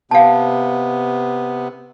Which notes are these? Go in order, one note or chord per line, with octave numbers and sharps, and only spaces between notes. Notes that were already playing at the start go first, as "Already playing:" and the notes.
C3 B3 F5 A5